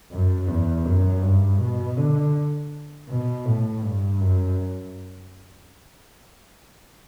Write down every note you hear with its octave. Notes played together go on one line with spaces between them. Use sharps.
F#2
E2
F#2
G2
B2
D3
B2
A2
G2
F#2